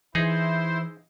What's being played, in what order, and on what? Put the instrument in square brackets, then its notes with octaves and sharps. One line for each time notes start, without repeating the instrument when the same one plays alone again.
[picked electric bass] E3 [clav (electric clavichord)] D#4 G#4 [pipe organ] E4 C5